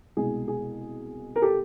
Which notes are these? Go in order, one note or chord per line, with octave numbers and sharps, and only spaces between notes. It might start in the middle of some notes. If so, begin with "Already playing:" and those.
C2 B2 G#3 G#4
G#4
A#4
G4 A4